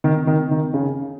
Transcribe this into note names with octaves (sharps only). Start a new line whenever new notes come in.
D#3
D#3
D#3
C#3